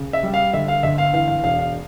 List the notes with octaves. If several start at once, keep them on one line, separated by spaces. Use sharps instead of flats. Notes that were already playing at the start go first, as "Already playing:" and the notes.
Already playing: C#3
E5
G3
F5
D3 E5
F5
G1 E5
F5
E3 F5
F5
E1 F5
F5